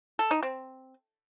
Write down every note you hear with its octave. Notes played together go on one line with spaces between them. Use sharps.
A4
D#4
C4